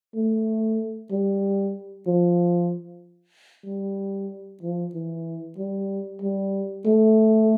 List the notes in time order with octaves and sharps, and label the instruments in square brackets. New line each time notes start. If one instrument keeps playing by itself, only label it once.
[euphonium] A3
G3
F3
G3
F3
E3
G3
G3
A3